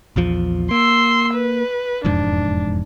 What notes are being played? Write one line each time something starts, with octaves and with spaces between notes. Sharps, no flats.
A#1 E2 F3
A#3 C6 E6
B4
E1 F2 G#2 D4